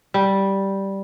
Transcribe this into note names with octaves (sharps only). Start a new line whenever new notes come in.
G3